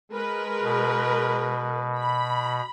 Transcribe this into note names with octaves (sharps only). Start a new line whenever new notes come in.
G#3 A#4 B4
B2
B5